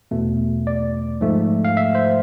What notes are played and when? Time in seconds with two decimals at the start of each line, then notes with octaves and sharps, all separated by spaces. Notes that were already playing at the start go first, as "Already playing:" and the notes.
0.11 E2 B2 A3
0.67 D5
1.21 G#2 F3 A3
1.65 F5
1.77 E5
1.95 C5